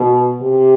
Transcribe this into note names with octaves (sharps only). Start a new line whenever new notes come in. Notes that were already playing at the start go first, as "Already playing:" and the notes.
Already playing: B2
C3